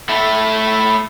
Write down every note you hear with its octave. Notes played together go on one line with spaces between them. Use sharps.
A3 E4